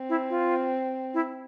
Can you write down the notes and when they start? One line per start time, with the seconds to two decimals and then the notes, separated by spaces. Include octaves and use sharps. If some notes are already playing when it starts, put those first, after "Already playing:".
Already playing: C4
0.09 E4
0.30 F4
1.14 E4